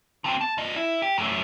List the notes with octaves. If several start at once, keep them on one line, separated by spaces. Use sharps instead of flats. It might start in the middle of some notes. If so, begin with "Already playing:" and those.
D3 C4
A5
G2 D#5
E4
G4
F#2 A3